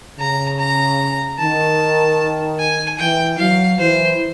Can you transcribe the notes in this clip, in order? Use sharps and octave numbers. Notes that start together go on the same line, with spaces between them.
C#3 A#5
A#5
D#3 A5
G#5
E3 G5
F#3 F5
E3 C5